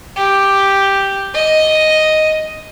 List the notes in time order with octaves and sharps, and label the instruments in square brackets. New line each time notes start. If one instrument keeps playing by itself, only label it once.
[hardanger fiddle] G4
D#5